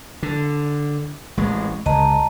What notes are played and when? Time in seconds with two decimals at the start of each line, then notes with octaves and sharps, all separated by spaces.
0.23 D3
1.37 A1 G#3
1.86 C#2 D#5 A5 A#5